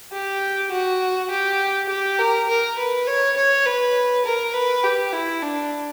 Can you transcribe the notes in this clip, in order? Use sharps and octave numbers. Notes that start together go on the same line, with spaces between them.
G4
F#4
G4
G4
A#4
A#4
B4
C#5
C#5
B4
A#4
B4
G4
E4
D4